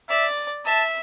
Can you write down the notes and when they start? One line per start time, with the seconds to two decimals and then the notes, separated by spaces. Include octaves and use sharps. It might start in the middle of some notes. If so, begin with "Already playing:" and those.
0.09 D5 E5
0.66 E5 A5